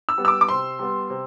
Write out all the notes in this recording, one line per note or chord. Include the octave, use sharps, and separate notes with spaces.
E6
G3 B3
E6
D6
D6
C3 C6
G3 B3
C3